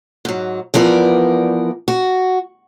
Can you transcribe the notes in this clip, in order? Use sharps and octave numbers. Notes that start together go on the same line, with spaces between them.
G#2 F#3
E3 F3 B3 A#4 D5
F#4